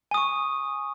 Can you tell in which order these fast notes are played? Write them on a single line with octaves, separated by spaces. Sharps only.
G#5 D#6 C#6